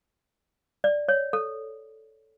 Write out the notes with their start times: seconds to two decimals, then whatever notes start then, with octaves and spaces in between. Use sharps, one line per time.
0.84 D5
1.08 C#5
1.33 A4